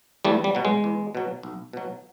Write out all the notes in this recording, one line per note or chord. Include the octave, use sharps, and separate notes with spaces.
E2 G3 A3
G3
B2 F#3
G#3
E2
B2 F#3
B1
B2 F#3